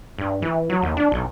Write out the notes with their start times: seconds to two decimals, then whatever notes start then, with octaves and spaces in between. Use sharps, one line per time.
0.18 G2
0.42 E3
0.70 F#3
0.82 D#2
0.97 D4
1.12 B1